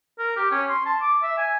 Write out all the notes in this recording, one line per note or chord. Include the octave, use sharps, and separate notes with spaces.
A#4
G4
C#4
C6
A5
D6
E5
G#5